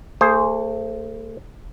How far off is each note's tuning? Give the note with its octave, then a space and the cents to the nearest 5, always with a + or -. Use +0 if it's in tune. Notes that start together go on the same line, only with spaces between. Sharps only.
A3 +35 G#4 +0 C5 +0